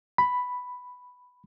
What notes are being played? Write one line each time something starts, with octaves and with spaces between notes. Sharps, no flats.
B5